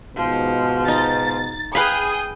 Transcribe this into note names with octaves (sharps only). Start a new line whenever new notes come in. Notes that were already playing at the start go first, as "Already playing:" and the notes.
G#2 B2 F3
D#4 A6
G#4 B4 F5 G5 B5 D#6